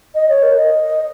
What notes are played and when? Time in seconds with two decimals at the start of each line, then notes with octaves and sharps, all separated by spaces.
0.15 D#5
0.29 C#5
0.43 A#4
0.57 D#5